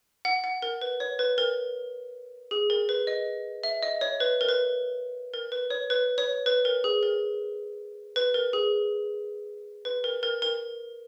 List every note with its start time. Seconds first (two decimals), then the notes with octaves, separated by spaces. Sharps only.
0.25 F#5
0.44 F#5
0.62 A#4
0.81 B4
1.00 C#5
1.19 B4
1.38 A#4
2.51 G#4
2.70 A#4
2.89 B4
3.07 D#5
3.64 E5
3.83 D#5
4.01 C#5
4.20 B4
4.41 A#4
4.49 B4
5.34 A#4
5.52 B4
5.70 C#5
5.90 B4
6.18 C#5
6.46 B4
6.65 A#4
6.84 G#4
7.03 A#4
8.16 B4
8.34 A#4
8.53 G#4
9.85 B4
10.04 A#4
10.23 A#4
10.42 A#4